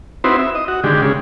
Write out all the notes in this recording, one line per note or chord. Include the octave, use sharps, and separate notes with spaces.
C4 D#4 E4 F#4 B4 C5
E5
D#5
F#4
D3 D#3 G#3 G4
C#3 G#3